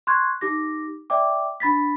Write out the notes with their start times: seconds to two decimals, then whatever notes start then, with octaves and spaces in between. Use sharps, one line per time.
0.07 C6 C#6 F#6 G#6
0.41 D#4 G4 D6 A#6
1.10 D5 E5 G5 D6
1.60 D4 B5 A6 B6